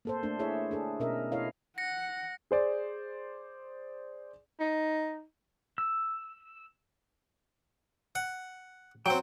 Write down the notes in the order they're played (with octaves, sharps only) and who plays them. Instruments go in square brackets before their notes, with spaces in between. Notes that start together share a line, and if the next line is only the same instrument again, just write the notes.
[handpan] A#3 A4 C5
A3 D4
E4 G#4 C#5 E5
D4 G#4 A4
B2 C#4 A#4 D#5 E5
E4 A4 C#5 D#5 F5
[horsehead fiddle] F#5 [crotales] A#6 C#7
[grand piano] G#4 C5 D5
[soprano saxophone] D#4
[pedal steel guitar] E6
[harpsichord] F#5
[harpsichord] F#3 C4 [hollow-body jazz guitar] G5